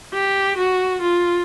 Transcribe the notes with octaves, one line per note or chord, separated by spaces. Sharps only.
G4
F#4
F4